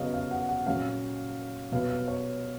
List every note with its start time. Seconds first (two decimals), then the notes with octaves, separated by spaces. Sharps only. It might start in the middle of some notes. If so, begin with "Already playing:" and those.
Already playing: C#3 F#3 B3 D#5 F5
0.14 F5
0.31 F#5
0.49 F#5
0.66 A#2 F#3 A#3 C#4 F5
1.72 B2 F#3 B3 F5
1.90 F5
2.08 C#5